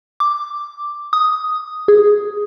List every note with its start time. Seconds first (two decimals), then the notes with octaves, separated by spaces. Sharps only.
0.20 D6
1.13 D#6
1.88 G#4